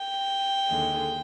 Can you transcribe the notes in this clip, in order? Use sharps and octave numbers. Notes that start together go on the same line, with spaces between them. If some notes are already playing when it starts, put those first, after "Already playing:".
Already playing: G5
D#2 D3 G#3